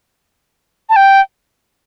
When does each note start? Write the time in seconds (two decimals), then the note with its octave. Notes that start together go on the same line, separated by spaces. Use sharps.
0.89 A5
0.96 G5